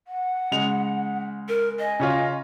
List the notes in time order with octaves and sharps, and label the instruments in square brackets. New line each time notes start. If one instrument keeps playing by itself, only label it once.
[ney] F#5
[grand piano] C#3 G#3 F7
[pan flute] A#4
[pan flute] D#5 [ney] G#5
[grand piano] C#3 C#4 F4